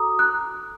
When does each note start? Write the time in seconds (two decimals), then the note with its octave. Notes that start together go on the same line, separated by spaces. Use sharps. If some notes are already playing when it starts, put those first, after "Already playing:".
Already playing: F#4 A4 A#5 D6 D#6
0.19 F#6